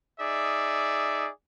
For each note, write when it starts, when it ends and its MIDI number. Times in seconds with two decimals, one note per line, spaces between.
0.20 1.30 63
0.20 1.30 68
0.20 1.30 74
0.20 1.30 76